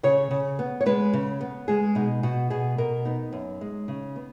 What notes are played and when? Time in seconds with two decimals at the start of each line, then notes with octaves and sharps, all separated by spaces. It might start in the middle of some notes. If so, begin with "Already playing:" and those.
0.03 C#3 C#5
0.31 C#3
0.59 B3
0.81 C#5
0.86 G#3 B4
1.13 C#3
1.41 B3
1.68 G#3 G#4
1.95 B2 D#4
2.23 B2 F#4
2.50 B2 G#4
2.78 B2 A#4
3.05 B3 D#4
3.32 F#2
3.61 G#3
3.88 C#3
4.16 B3